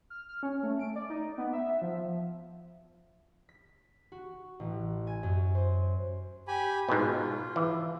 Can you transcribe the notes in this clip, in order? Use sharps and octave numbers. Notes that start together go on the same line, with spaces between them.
F6
F6
C#4
A3
D7
D5
D#4
B3
E5
F3
B6
F#4
A1
G#5
F#2
C5
G4 G#5 B5
G#2 B2 F4
E3